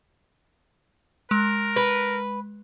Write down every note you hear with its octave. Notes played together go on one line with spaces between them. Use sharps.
G#3 A#4
B4